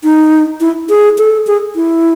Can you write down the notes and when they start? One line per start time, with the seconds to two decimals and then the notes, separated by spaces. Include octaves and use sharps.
0.04 D#4
0.60 E4
0.89 G#4
1.18 A4
1.47 G#4
1.76 E4